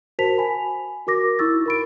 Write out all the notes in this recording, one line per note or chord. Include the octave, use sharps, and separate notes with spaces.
F#4 A#4 C5 A5 B6 F7
G#5 B5
F#4 A#4 D6 A#6
D#4 E4 C#6 E6 A6
A#4 B5 D7